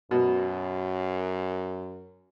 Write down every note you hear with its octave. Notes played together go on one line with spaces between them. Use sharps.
F#2 B2